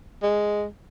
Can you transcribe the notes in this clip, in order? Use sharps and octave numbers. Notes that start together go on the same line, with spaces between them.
G#3